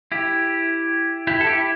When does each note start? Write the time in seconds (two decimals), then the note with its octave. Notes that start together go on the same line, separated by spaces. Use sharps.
0.12 E4 G4
1.27 E4 G4
1.41 A4
1.47 E4 G4